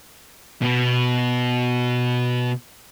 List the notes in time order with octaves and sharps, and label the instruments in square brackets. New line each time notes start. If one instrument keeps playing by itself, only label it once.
[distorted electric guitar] B2 B3